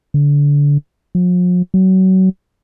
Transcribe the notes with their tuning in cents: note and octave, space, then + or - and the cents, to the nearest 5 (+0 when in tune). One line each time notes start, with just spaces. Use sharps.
D3 -25
F3 +45
F#3 +25